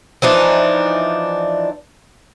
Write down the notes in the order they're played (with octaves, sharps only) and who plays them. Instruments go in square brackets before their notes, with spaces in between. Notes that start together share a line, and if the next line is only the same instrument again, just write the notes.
[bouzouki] E3 F3 D4 D#4